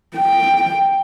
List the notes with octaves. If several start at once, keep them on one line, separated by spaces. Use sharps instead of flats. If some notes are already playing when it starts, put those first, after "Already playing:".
G5